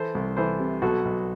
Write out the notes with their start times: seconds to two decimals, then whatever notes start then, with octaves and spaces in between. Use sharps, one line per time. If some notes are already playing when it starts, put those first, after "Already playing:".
Already playing: E3 A4 C5
0.15 C2
0.37 E3 A4 C5
0.59 C3
0.82 B1 F#4 A4
1.05 B1